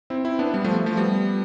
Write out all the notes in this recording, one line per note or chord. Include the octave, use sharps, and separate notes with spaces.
C4 E4
C4 E4
B3 D4
G3 B3
F3 A3
F3 A3
G3 B3